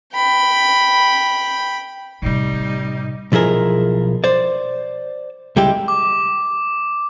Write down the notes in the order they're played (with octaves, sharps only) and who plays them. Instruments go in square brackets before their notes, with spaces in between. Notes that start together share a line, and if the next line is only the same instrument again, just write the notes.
[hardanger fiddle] G5 B5
[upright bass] A2 C3 [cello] G3 D#4
[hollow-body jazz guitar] B1 F3 E4 G#4 A#4
C5 D5
C#2 G3 G#3 E4 G4
[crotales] D6